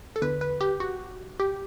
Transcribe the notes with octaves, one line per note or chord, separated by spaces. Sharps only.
A4
E2 D3 B4
B4
G4
F#4
G4